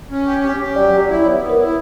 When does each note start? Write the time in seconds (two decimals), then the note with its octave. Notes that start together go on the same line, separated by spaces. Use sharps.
0.11 C#4
0.26 G4
0.44 G4
0.60 G4
0.76 F#3 D5
0.93 F#3
1.01 D5
1.09 E4
1.25 B3 C#5
1.41 B3
1.50 A#4
1.59 E4